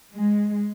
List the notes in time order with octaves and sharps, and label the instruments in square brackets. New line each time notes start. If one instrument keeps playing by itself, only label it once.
[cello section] G#3